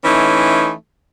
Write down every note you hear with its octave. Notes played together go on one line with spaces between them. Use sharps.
E3 A3 C#4 D#4